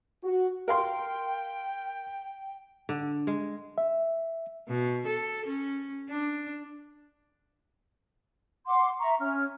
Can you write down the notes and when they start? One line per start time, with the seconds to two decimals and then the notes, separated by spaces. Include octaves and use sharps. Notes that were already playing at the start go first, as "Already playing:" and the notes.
0.24 F#4
0.68 A#4 F5 G5 C6
2.89 D3
3.27 G#3
3.78 E5
4.68 B2
5.07 A4
5.46 C#4
6.10 D4
8.66 F#5 C6 D6
9.00 E5 A#5 C#6
9.20 C#4 F6